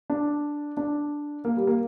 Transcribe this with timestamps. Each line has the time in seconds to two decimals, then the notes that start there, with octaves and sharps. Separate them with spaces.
0.10 D4
0.77 D4
1.45 A#3
1.57 G3
1.67 A#3